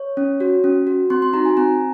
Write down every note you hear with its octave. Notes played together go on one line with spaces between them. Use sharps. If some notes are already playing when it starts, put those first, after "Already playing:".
Already playing: C#5
C#4
F#4
C#4
F#4
C4 C6
C6
D#4 F#4 A#5
G#5
C4 A#5